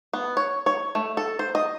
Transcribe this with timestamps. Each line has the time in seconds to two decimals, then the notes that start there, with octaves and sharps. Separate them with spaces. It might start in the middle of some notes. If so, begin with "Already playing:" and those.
0.13 B3
0.37 C#5
0.66 C#5
0.95 A3
1.17 A4
1.39 C5
1.55 D#5